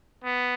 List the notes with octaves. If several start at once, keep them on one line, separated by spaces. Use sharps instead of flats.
B3